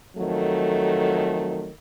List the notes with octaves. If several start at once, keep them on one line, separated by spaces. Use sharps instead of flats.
F2 D#3 F#3 A3